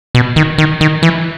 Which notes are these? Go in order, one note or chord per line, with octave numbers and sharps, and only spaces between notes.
B2
D#3
D#3
D#3
E3